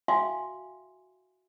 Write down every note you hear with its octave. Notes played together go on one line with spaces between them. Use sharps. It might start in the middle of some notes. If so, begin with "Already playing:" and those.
F#4 E5 F5 G5 G#5 C6